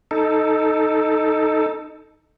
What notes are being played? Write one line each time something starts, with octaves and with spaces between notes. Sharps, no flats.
D#4 A4